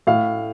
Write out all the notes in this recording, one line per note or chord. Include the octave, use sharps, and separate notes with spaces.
A2 F5